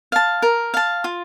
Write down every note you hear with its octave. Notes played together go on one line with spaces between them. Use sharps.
F5 A5
A#4
F5 A5
F4